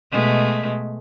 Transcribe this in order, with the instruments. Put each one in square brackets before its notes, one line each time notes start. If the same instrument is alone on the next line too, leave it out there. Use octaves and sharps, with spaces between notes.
[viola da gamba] B2 G#3 A3